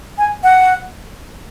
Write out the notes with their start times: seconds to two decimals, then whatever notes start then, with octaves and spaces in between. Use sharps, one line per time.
0.18 G#5
0.43 F#5